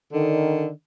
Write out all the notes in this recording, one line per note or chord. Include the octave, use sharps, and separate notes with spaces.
D3 D#3